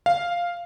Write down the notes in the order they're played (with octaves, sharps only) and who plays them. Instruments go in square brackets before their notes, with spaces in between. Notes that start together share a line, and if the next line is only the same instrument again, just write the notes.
[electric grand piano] F5